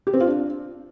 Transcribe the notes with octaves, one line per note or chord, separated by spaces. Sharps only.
G4
C4
F4
D4